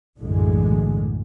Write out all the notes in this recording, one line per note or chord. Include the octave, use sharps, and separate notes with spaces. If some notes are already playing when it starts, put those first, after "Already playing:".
B1 F#2 A2 D3 E3 G#3